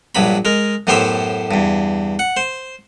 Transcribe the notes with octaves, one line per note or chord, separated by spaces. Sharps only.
A#1 G2 F#3 B5
G#3 A#4
F#2 A2 B3 G4 C5 E5
E2 G2
F#5
C5